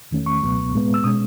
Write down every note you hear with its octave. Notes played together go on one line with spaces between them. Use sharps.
E2 D#3 A3 C#4
C#6
C#2 B2 F#3 B3
A2 G#3 B3
E6
B2 G#3 C#4 D#6